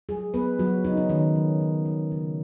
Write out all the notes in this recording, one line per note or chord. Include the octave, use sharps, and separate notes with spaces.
F#3 G#3 G#4
F#3 B3 B4
C#3 F#3 F#4
C#3 D#4
C#4
D#3 F#3 D#4
F#3
G#3
G#3
C#3